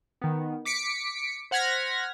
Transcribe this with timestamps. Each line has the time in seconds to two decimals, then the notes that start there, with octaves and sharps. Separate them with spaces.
0.22 D#3 B3
0.65 D6 B6 C#7 D7
1.51 C5 F#5 F6 G#6 A#6 B6